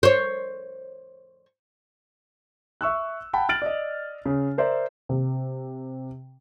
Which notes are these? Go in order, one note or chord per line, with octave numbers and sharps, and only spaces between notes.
C5 C#5
E5 C#6 E6 F#6
F#5 G5 A5 B5
F6 A6 D7 F#7
D5 D#5
C#3
A#4 C5 D5 E5
C3